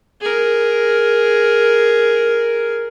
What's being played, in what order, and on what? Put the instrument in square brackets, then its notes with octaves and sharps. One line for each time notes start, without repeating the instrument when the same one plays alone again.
[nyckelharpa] G#4 A#4